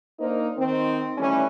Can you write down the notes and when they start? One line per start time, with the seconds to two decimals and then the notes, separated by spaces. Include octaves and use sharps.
0.19 A#3 D4 D#4 A#4 C5
0.57 D#3 C4
1.17 D#3 E3 G3 A3 C#4